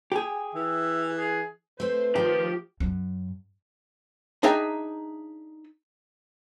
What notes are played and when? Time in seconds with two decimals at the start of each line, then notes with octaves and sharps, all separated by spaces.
0.12 G4 G#4
0.55 E3 E5
1.17 G#4
1.80 A3 C4 B4 C5
2.16 D#3 F3 G4
2.80 F#2
4.43 D4 D#4 G#4 E5 G5 A#5